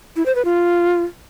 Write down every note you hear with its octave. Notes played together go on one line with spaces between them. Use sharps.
E4
C5
B4
F4